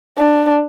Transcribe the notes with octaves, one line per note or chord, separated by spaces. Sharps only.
D4